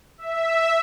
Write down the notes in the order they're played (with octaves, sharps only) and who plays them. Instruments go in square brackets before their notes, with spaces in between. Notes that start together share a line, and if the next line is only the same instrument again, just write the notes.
[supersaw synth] E5